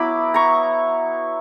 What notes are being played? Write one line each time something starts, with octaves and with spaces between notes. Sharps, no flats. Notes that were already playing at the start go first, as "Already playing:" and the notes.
Already playing: F#3 B3 E4 B5 D6
A#5 C#6